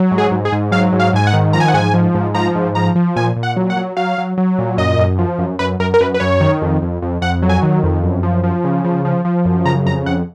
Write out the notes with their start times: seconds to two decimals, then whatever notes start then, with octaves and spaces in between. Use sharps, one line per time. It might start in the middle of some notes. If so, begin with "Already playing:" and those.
Already playing: F#3
0.11 G#2
0.18 G#4
0.31 G#2
0.45 G#4
0.52 G#2
0.72 F#3 F5
0.92 G#2
1.00 F5
1.13 G#2 G#5
1.27 F#5
1.33 D#3
1.53 F3 A#5
1.60 G#5
1.68 F#5
1.74 G#2 G#5
1.94 F3
2.15 G#2
2.35 F3 A#5
2.55 G#2
2.75 F3 A#5
2.95 F3
3.16 A#2 G#5
3.36 A#2
3.43 F#5
3.56 F#3
3.70 F#5
3.77 F#3
3.97 F#3 F5
4.18 F#3
4.38 F#3
4.59 A#2
4.78 F#2 D#5
4.99 F#2
5.19 F3
5.39 F#2
5.59 F#2 B4
5.80 F#2 A#4
5.94 A#4
6.01 F#2 B4
6.14 B4
6.20 F#2 C#5
6.41 D#3
6.62 F2
6.82 F2
7.02 F2
7.22 F2 F#5
7.43 F#3
7.49 G#5
7.62 D#3
7.83 F2
8.04 F#2
8.23 F3
8.44 F3
8.64 C#3
8.84 F3
9.05 F3
9.25 F3
9.45 F#2
9.65 C#3 A#5
9.86 F2 A#5
10.06 F2 F#5